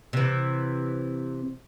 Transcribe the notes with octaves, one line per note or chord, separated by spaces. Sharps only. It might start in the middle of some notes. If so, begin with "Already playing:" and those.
C3 E3